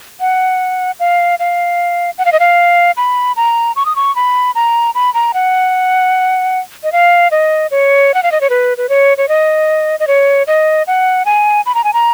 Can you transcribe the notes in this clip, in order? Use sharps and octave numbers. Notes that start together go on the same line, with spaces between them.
F#5
F5
F5
F#5
F5
D#5
F5
B5
A#5
C#6
D#6
C#6
B5
A#5
B5
A#5
F#5
D#5
F5
D#5
C#5
F#5
F5
D#5
C#5
B4
B4
C#5
C#5
D#5
D#5
C#5
D#5
F#5
G#5
B5
A#5
G#5
A#5